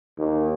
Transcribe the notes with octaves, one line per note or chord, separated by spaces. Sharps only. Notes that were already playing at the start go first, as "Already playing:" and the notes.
D#2